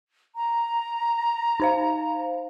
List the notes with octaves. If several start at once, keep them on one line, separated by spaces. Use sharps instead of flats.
A#5
D#4 C5 F5